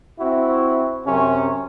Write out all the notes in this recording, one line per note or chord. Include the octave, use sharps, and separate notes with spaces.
C4 E4 F#4
F#2 C3 C#4